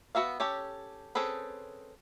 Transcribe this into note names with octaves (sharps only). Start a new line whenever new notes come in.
B3 F#4 E5 F5
C#4 G4 A4 C#5
C4 C#4 G#4 A4 B4